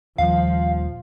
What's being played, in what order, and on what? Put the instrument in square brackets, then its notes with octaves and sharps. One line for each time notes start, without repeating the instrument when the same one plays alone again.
[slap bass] D#1 D#2 G3 [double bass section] F3 [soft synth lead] F5